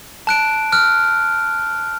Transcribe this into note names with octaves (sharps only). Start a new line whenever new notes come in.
A5 F#6 D7
F6 F#6